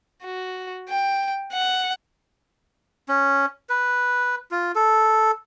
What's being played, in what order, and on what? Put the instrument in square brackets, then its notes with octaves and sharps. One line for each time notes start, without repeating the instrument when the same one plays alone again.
[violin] F#4
G5
F#5
[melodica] C#4
B4
F4
A4